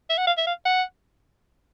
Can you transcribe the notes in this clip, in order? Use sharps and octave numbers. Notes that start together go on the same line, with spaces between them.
E5
F#5
F5
E5
F5
F#5